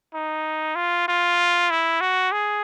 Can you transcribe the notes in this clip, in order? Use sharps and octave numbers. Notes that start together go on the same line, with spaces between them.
D#4
F4
F4
E4
F#4
G#4